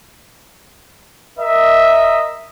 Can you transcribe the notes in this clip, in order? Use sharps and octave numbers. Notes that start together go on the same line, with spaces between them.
A#4 D#5 E5